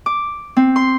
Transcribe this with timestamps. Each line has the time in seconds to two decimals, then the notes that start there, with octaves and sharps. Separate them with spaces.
0.06 D6
0.57 C4
0.76 C6